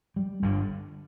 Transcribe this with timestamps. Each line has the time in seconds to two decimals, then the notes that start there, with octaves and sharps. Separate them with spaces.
0.16 G3
0.42 G1 G2 D3